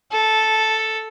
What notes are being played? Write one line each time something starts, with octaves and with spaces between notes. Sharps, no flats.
A4